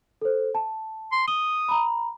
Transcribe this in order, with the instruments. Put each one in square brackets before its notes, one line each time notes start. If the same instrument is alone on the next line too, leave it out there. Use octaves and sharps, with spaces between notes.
[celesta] A4 C5
A5
[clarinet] C6
[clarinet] D#6 [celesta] G7
[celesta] A#5 B5